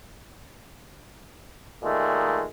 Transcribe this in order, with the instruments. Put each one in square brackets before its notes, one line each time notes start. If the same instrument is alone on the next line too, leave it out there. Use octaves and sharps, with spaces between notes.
[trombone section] A#2 D#3 G#3 A3